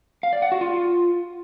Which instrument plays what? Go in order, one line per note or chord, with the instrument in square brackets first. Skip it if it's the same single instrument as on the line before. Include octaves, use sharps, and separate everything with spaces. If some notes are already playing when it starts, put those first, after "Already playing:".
[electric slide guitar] F5
D5
F#5
F#4
F4